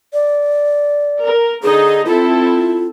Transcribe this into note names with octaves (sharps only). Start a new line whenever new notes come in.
D5
A#4
D3 D#4 G#4 D#5
C4 E4 F4 A4